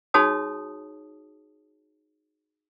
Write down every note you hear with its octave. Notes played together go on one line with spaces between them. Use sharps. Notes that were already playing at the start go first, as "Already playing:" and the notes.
D#4 F#4 G#4 C#5 A5 D#6